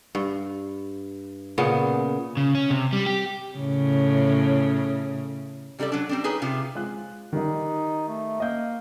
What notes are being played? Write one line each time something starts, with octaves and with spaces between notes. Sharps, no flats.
G2
A#2 C#3 B3
C#3
C#4
C3
G3
G4
A2 C#3
C3 G3 F4 A4 D5
F#3 D4
G3 C4 D4
D#4 G#4 B4 C#5
C3 F4
G#3 F4 F#6
D#3 G3 D#4 D#5
A3
A#3 D#5 G6